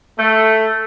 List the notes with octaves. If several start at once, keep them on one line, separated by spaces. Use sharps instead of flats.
A3